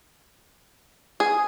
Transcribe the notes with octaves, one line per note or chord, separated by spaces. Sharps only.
G#4